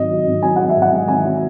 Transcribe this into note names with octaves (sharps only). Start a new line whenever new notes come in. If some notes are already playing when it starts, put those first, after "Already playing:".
Already playing: G#1 F#3 D#5
F#3
G#1
F#3 G#5
G#2 F#5
E5
G#2
F#5
G#2
G#1 G#5
F#3